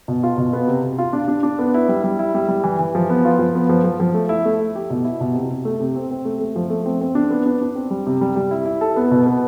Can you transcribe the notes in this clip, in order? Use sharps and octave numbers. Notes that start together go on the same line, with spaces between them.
B2
F4
B2
B3
C3
C3
F4
D4
D4
D4
B3
E4
G3
G3
E4
G3
G3
E3
E3
F3
B3
F4
F3
B3
F3
F3
F3
A3
E4
A3
E4
G4
B2
E4
B2
C3
C3
A3
C3
C4
C4
A3
A3
F3
A3
C4
C4
D4
B3
D4
D4
C4
G3
C3
G3
G3
E4
E4
A4
B3
B2
B3